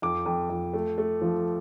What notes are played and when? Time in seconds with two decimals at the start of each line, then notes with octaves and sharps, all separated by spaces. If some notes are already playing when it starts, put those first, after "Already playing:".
0.02 F2 D6
0.26 F2
0.50 F2
0.74 A3
0.98 A3
1.22 F3